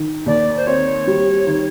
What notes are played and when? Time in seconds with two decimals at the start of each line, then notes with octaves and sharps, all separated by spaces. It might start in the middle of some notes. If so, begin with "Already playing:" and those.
Already playing: D#3
0.26 D#2 D5
0.57 C5
0.67 C4 C#5
1.07 G3
1.47 D#3